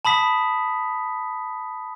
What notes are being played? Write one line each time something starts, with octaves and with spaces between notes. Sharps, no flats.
A5 B5 D#6 B6